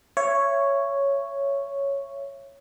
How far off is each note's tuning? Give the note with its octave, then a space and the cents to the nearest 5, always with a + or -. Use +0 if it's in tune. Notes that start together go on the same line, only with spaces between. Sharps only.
C#5 +0 E5 +30